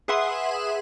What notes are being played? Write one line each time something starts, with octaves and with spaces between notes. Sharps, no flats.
G#4 B4 E5 F#5 C6 D#6